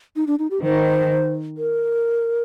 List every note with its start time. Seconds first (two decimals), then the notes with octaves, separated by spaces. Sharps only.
0.16 D#4
0.27 D4
0.39 D#4
0.51 G4
0.63 D#3 C5
1.57 A#4